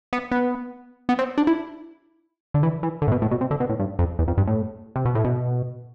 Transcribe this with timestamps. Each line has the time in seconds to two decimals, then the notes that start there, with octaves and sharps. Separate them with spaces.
0.13 B3
0.31 B3
1.09 B3
1.19 C4
1.38 D4
1.47 E4
2.54 D3
2.63 E3
2.83 E3
3.02 D3
3.08 A2
3.12 B2
3.22 A2
3.31 B2
3.41 C3
3.51 D3
3.60 B2
3.70 A2
3.79 G2
3.99 F2
4.19 E2
4.28 F2
4.38 G2
4.47 A2
4.96 C3
5.05 B2
5.15 A2
5.25 B2